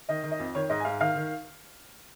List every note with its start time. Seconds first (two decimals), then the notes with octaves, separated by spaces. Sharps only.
0.09 D#3 D#5
0.24 D#3
0.31 D#5
0.39 F2
0.55 D#3 C#5
0.69 G#2 D#5
0.80 G#5
0.85 G#2 F5
1.01 D#3 F5
1.16 D#3